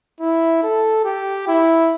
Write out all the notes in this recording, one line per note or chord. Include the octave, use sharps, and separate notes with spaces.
E4
A4
G4
E4